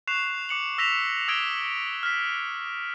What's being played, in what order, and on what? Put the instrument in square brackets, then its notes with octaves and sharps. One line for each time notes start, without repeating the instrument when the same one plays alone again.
[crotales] C#6 F#6 C7 E7 F7
D6 C#7 F#7
E6 A#6 B6 E7 F7
D#6 E6 G#6 A#6 D7 G7
F6 B6